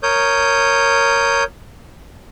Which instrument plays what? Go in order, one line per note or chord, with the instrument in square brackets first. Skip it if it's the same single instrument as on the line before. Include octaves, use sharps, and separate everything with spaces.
[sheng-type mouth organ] A#4 C#5 D#6 G6